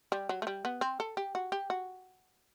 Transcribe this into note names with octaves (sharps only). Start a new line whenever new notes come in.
G3
F#3
A3
G3
B3
C4
A4
G4
F#4
G4
F#4